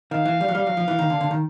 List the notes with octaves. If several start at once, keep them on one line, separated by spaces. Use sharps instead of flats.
D#3 F5
E3
G3
F#3
G3 F5
F#3
F3
E3
D#3
D3
D3
D#3